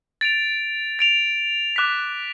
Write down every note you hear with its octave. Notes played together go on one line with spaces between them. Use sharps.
A6 D7 F7
A6 D7 F7
D6 F#6 B6